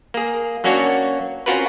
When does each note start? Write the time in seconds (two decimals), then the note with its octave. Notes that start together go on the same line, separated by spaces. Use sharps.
0.14 A#3 G#4
0.64 F#3 A#3 C#4 D4 F#4 C#5
1.46 C4 C#4 F4 F#4 A#4 B4